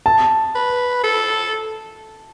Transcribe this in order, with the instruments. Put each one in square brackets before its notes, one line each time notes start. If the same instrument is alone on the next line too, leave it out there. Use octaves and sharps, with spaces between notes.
[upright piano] A5
[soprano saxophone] B4
A4